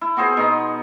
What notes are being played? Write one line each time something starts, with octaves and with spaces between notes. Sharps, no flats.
E4
B3 F#4 G#4 C5
B2 D#4